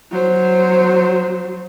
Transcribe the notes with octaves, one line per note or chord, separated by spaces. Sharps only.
F#3 C5